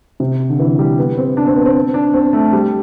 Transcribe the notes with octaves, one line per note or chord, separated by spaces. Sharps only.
C3
D3
E3
G3
B3
C4
D4
C4
B3
C4
D4
C4
A3
G3